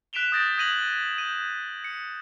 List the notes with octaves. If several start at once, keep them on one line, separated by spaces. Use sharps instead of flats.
F#6 B6 D7 E7 F7 G7
D#6 G6 A6 A#6 D7
D#6 G#6 A#6 D#7 F7 F#7
G6 D#7
C#7